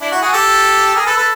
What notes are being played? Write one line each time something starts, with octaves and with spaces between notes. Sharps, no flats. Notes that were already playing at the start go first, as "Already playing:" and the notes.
D4 E4
E4 F#4
F#4 G#4
G4 A4
G#4 A#4
A4 B4
A4 B4